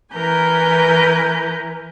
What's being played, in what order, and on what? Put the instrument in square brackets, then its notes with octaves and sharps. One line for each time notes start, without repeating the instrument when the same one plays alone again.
[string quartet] E3 A#4 B4 G#5 A#5 G6